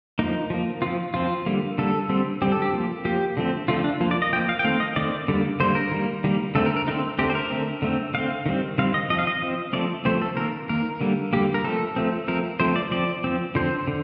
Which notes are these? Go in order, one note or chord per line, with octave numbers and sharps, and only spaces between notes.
F3 A#3 D#4
F3 A#3
F3 C4 F4
F3 C4 F4
D3 G3 A#3
D3 G3 A#3 A4
D3 G3 C4
D3 G3 C4 G4
A4
G4
F3 A#3
F3 A#3 G4
D3 F3 A3 C4
D3 F3 A3 C4 F4
D4
F3 A#3
D5
D#5
F3 A#3 G5
F5
G5
D#3 A3 C4 F5
D#5
D#3 A3 C4 D5
D3 G3 A#3
D3 G3 A#3 C5
A#4
D#3 G3 A#3
D#3 G3 A#3
D3 A3 C4 A4
A#4
A#4
D3 A3 C4 D#4
D3 A3 C4 G4
C5
A#4
D3 A3 C4
D3 A3 C4
D3 A3 C4 F5
D#3 G3 C4
D#3 G3 C4 F5
D#5
F3 C4 D#5
F5
D#5
F3 C4
F3 A3 C4 D5
F3 A3 C4 C5
A4
D#3 A#3 A#4
D#3 A#3 A#4
D3 G3 A#3
D3 G3 A#3 G4
A#4
F3 A3 C4 A4
F3 A3 C4
F3 A3 C4 A#4
F3 A3 C4 C5
D5
F3 C4 D5
F3 C4
D3 F3 C4 C5
D3